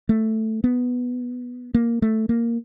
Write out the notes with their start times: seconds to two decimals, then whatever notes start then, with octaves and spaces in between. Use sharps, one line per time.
0.09 A3
0.64 B3
1.74 A#3
2.02 A3
2.29 A#3